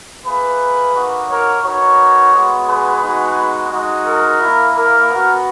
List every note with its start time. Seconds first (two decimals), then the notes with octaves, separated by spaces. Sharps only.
0.24 A#3 E4 G#4 B4
0.94 A#3 D#4 F#4
1.28 A#4 C#5
1.63 B3 D#4 F#4 A#4 C#5
2.33 G#3 B3 F#4
2.67 G#4 B4
3.02 G#3 B3 D#4 F#4
3.71 G#3 D#4 F#4
4.05 A#4
4.40 A#3 E4
4.75 A#4
5.10 B3 F#4